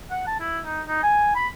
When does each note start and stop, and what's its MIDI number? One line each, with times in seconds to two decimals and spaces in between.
0.11 0.22 78
0.27 0.37 81
0.40 0.59 64
0.64 0.81 63
0.87 1.03 63
1.03 1.35 80
1.35 1.48 83